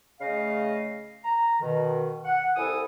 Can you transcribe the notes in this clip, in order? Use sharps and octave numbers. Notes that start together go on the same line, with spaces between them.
C#3 A3 D#5 F5
A#5
B2 D#3
F#5
C2 E4 A4 G#5 D#6